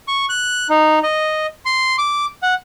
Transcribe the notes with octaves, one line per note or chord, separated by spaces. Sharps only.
C#6
F#6
D#4
D#5
C6
D6
F#5